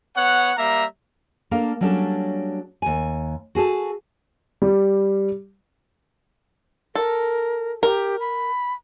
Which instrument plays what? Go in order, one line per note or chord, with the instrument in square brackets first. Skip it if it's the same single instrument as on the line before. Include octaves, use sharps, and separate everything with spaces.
[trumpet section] B3 C#5 F#5
G3 A#3 E5 A#5
[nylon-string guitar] A#3 D4 A4 F5
F#3 G3 C#4 D4 A4
D#2 G#5
F#4 G#4 A4 A5
[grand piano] G3
[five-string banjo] A4 [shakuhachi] A#4
[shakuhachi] G4 [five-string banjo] A#4
[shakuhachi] B5